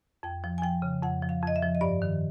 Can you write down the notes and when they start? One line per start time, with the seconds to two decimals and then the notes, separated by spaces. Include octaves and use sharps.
0.23 F2 G5
0.44 F3
0.58 G#5
0.62 F3 G5
0.82 C#3
1.02 F2 F#5
1.22 F3
1.29 F5
1.42 F2
1.47 D#5
1.56 E5
1.62 F3
1.75 D#5
1.81 G2 D5
2.02 D#3